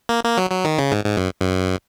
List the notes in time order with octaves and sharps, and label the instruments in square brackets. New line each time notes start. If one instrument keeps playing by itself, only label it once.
[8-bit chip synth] A#3
A#3
F#3
F#3
D#3
C#3
G#2
G#2
F#2
F#2